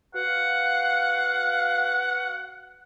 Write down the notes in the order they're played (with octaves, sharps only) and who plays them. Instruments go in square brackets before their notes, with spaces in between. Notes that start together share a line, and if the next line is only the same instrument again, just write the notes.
[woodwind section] F#4 B4 F5 [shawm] F#5